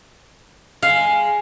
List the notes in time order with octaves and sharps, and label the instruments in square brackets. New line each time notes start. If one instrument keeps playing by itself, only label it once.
[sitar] G#3 [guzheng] F5